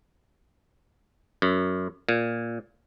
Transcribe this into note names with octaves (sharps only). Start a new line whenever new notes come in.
F#2
A#2